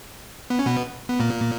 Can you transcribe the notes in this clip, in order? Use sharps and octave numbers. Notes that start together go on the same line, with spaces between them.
B3
C#4
B2 B3
B3
A#2 A#3